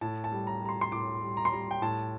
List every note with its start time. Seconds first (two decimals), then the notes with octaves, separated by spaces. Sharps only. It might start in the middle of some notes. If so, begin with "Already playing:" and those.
0.01 A2 A5
0.24 A5
0.32 G3
0.47 A#5
0.62 G3 A#5
0.69 C6
0.81 C6
0.92 A2 D6
1.22 G3
1.37 A#5
1.45 C6
1.52 G3 A#5
1.71 G5
1.82 A2 A5